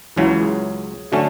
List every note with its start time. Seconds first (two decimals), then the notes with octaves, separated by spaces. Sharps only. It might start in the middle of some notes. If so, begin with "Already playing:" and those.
0.16 C#2 C#3 E3 F#3 E4
0.40 G#3 G#4
1.12 D3 F#3 A3 C#4 F#4